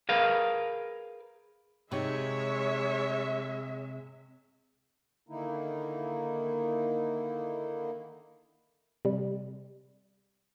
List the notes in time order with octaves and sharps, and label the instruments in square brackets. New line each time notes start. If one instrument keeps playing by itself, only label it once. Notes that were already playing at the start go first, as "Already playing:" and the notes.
[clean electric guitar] G#4 A#4 B4 F5
[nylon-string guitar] C3 D#4 [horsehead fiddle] G#3 E5 [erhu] C#5
[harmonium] D3 D#3 A#3 D#4 E4
[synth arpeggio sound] C3 G3